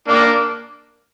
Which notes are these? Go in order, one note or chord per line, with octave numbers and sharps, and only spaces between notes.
A#3 D4